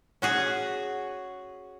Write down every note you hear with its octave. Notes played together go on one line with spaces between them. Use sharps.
C#4 F#4 G#4